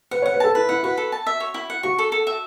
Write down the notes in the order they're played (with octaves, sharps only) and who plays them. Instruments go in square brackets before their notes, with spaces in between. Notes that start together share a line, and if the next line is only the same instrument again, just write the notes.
[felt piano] B4 [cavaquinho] F#5
[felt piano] C#5 [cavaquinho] F#5
[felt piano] B4
[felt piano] A4 [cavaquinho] A5
[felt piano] E4 [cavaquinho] B4
[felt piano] E4 [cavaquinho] F#5
[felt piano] F#4 [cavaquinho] B4
[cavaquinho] A4
A5
E5
C#5
E4
F#5
[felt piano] F#4 [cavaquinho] C#6
[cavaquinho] A4
A4
E5